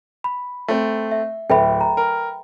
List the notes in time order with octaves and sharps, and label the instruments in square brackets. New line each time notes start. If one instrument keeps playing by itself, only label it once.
[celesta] B5
[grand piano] A3 C4
[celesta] E5
[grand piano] D1 [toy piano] A4 B4 E5 [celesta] G5 B5
[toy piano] A#5
[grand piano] A#4